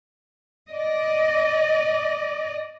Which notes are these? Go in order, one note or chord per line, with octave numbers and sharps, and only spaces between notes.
D5 D#5